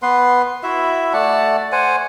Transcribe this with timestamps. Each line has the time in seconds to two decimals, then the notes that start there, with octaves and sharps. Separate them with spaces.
0.02 B3 B4 C6
0.63 E4 F#4 E5
1.13 A3 D5 F#5 A5
1.72 C5 F#5 G#5